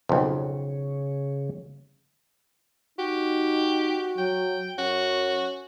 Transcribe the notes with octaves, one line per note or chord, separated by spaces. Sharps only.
B1 F2 C#3
D#4 F#4 G4
F#3 G5
F#2 C#4 F#4